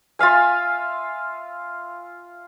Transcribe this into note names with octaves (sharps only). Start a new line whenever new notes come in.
F4 E5 F5 G#5